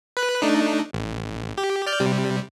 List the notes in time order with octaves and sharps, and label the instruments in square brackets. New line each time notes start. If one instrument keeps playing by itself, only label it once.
[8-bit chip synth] B4 F#6
A3 D4 D#4
A1
G4
D5 F6 G6
C3 G3